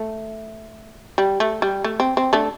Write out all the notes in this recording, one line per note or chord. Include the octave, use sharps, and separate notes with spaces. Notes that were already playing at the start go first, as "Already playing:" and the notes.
Already playing: A3
G3
A3
G3
A3
C4
C4
A3 D4